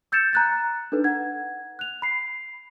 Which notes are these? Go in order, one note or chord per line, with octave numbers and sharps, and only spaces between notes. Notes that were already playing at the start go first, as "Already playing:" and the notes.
E6 G6 A6 C#7 E7
A#5 F#6 A6
D4 D#4 A4 B4
F#5 G#6
F#6 F7
B5 C7